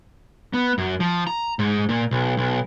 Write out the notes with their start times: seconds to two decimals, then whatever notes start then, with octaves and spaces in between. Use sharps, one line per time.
0.53 B3
0.78 F#2
1.00 F3
1.27 A#5
1.59 G#2
1.89 A#2
2.11 B1
2.37 B1